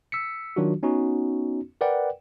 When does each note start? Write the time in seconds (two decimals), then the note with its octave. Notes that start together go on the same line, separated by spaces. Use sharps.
0.12 E6 B6 C#7
0.56 D#3 F#3 D4 F4 F#4
0.83 B3 C#4 D#4 F#4
1.81 A#4 B4 D5 F#5 G5